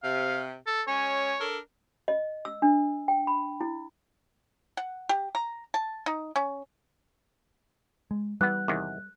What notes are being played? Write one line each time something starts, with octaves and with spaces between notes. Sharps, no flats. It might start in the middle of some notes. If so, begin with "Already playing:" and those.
C3 F5
A4
G#3 C#4 C#5
D4 A4 A#4
D#5
E6
D4
G5
B5
E4
F#5
G4
A#5
A5
D#4
C#4
G#3
E3 G3 B3 F#6
E2 C3 D#3